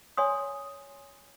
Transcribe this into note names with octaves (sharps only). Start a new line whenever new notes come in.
C#5 G#5 C6 D#6